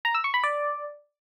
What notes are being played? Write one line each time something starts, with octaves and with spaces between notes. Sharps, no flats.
A#5
E6
C#6
B5
D5